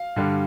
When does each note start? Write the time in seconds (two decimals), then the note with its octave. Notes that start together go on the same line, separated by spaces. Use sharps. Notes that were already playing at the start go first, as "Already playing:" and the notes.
Already playing: F5
0.16 G2 D3 G3